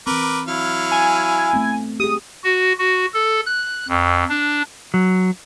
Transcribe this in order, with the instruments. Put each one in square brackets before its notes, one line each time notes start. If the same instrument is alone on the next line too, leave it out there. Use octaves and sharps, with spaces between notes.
[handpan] E3 C4 [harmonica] A#4 B4 D6
[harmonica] F#3 F5 [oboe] E4
[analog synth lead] G#5
[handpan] A3 B3 C4
[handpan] G4 G#4 [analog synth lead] D#6
[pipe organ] F#4
F#4
A4
F#6
F2
D4
[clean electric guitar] F#3